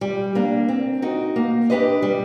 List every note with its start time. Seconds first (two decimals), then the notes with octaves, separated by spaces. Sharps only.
0.01 G3
0.35 A#3 D4
0.68 C4
1.02 D#4 F#4 A#4
1.36 A#3
1.70 D4 G4 B4 D#5
2.02 G3